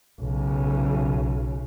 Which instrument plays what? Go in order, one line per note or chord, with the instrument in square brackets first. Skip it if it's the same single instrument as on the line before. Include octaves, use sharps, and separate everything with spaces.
[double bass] B1 C#3